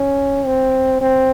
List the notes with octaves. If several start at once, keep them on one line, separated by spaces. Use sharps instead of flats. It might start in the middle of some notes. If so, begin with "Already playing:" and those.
Already playing: C#4
C4
C4